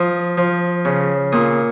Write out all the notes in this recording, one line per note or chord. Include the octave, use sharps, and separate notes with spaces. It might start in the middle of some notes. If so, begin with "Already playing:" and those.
Already playing: F3 D#6
F3
C#3
A#2 D#6